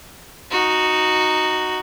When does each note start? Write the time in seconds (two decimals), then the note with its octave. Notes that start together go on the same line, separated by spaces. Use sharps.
0.51 D#4 F#4